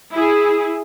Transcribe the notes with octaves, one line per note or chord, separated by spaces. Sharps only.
E4 G#4